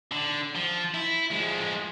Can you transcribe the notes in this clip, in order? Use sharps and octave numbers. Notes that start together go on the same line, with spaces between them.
D3
F3
E4
F3 G#3